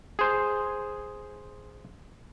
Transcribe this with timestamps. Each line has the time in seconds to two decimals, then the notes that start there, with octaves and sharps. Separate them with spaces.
0.19 G#4 C5